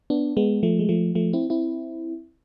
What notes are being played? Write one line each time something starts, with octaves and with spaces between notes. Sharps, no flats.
B3 D4
G#3 B3
F3 A3
G#3
F3 A3
F3 A3
C4 E4
C4 E4